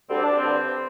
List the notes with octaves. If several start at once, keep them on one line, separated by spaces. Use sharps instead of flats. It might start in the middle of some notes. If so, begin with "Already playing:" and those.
D2 D3 G3 C4
D4
C4
G2 D3 G3